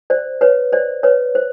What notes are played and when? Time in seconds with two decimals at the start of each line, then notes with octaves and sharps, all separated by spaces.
0.10 C5 D5
0.41 B4 C#5
0.72 C5 D5
1.03 B4 C#5
1.35 C5